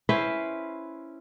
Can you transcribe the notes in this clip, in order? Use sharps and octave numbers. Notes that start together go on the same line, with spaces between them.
C#4 E4 B4 C5